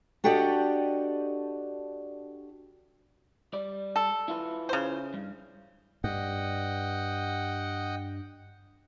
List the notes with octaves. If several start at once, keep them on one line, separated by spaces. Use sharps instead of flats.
D4 F#4 G4 A4 D5 D#5
G3 D5
A4
E4 F4 B4
C#3 C5
G2
G2 D#5 F#5 G5